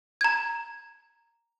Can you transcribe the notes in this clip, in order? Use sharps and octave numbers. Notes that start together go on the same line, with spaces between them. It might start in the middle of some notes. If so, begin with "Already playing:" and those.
A#5 G#6